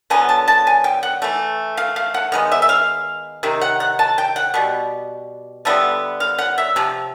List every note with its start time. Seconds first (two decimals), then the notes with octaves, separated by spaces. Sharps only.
0.10 D3 F#3 B3 G#5
0.29 A5
0.48 A5
0.67 G#5
0.84 G5
1.03 F#5
1.22 E3 A3
1.77 F5
1.96 F5
2.14 F#5
2.32 D#3 G#3 B3
2.52 E5
2.62 E5
2.69 F5
3.43 C3 D#3
3.61 F#5
3.80 F#5
3.99 A5
4.18 G5
4.36 F#5
4.54 B2 G3
5.65 D3 G3 B3 E5
6.20 F5
6.38 F#5
6.58 E5
6.76 C3 F3